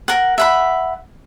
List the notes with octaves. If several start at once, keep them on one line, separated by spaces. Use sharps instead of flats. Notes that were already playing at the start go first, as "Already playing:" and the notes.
A#4 F#5
E5 F#5 B5